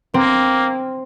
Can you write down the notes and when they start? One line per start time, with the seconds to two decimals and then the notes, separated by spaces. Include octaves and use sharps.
0.14 A#3 C4